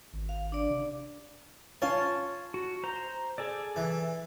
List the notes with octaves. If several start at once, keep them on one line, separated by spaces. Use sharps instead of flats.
G#1
F5
D4 D5
C3
C#4 F4 A5
F#4
C5 A#5
G#4 A4 D5
E3